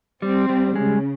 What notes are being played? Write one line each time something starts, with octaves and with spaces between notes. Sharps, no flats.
G3 C4
G3
C#3 G#3